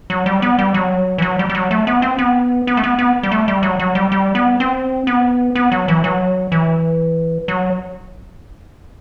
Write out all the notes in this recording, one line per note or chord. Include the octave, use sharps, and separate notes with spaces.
F#3
G3
B3
G3
F#3
E3
F#3
G3
G3
F#3
A3
B3
C4
B3
B3
A3
B3
B3
G3
A3
G3
F#3
F#3
G3
G3
B3
C4
B3
B3
F#3
E3
F#3
E3
F#3